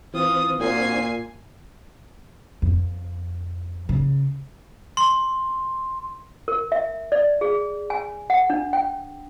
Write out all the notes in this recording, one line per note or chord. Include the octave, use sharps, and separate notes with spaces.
E3 C4 F4 D#6
A#2 C4 D4 F#4 G#5 C7
F2
C#3
C6
A#4
E5
D5
G#4
G#5
F#5
D4
G5